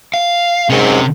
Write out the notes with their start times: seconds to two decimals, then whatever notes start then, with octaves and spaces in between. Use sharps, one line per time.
0.14 F5
0.70 G#2 C3 C#4 A#4 C#5